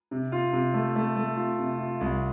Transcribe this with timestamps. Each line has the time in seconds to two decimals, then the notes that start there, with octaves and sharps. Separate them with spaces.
0.11 C3
0.32 F4
0.53 C3
0.74 A3
0.96 A3
1.16 A3
1.37 F4
1.59 C3
1.79 F4
2.01 C2